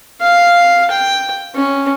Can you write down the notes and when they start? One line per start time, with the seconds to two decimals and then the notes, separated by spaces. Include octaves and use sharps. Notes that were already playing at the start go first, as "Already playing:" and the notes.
0.21 F5
0.90 G5
1.55 C#4